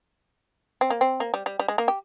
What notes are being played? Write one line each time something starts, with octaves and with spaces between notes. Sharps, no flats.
C4
A#3
C4
A#3
G3
G3
G3
G#3
A#3
G4